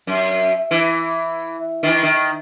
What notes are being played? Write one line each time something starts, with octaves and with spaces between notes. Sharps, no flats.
F#2
E3
D#3 E3
D#3